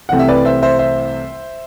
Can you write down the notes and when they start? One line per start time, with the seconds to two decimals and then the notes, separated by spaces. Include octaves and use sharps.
0.09 C2 C3 E3 A3 C4 F#5
0.19 E5
0.28 B4 D5
0.45 C5 E5
0.62 C5 E5
0.79 C5 E5